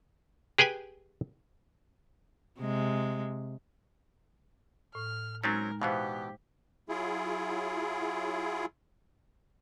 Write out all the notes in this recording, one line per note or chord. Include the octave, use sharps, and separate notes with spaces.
G4 G#4 B4 G5 G#5
C3 G#3
A2 F6
F#3 G#3 C4 C#4 D#4 A#4 A6
B2 E3 B3 G4 C5 F5
F#3 E4 F4 G#4